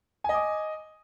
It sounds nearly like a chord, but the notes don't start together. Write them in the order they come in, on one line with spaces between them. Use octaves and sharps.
G#5 D#5 D6